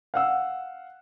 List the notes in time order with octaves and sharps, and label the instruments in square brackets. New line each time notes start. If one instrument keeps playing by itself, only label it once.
[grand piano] F5 F#5 E6